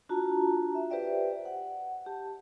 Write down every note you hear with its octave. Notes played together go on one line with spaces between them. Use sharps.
D4 F4 F#4 A5 A#5
E5
G4 B4 C5 D5 E5 G5
F#5
G4 A5